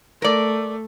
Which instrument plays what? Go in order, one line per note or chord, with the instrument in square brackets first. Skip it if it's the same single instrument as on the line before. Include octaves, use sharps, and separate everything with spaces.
[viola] A3 [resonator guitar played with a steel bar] A#4 D5